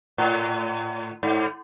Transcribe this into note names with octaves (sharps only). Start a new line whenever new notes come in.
A2
G#2